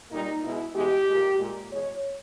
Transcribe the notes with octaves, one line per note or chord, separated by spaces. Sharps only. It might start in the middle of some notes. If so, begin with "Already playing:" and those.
A#2 G3 A#3 D#4
B2 G#3 E4
E2 B2 G#3 G4
A#2 G#3
A#2 G#3
E2 B2 G#3 C#5